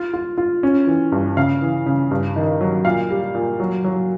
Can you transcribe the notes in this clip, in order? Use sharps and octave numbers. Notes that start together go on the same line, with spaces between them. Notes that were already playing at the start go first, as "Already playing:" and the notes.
Already playing: F4
F4
F4
C#4
E3
G2
C#3 F5
E3
C#3
G2
D#3
F#3
A#2 F5
G3
A#2
F#3
F#3